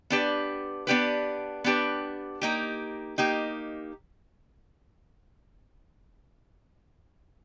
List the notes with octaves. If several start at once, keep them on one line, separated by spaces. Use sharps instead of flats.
B3 D4 G4 B4
B3 D4 G4 B4
B3 D4 G4 B4
A#3 D#4 G4
A#3 D#4 G4